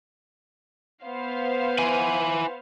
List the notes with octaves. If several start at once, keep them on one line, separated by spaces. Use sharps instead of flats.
B3 C5 F5
E4 G#5